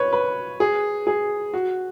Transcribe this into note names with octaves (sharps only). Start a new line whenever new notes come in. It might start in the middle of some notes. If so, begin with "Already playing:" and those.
Already playing: B4 C#5
B4
G#4
G#4
F#4